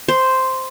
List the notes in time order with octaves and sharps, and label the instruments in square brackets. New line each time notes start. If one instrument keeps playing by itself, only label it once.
[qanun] C5